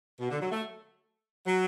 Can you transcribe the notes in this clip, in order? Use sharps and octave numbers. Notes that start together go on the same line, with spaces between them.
B2
D3
F#3
A3
F#3